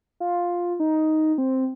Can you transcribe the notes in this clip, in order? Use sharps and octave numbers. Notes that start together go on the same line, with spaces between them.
F4
D#4
C4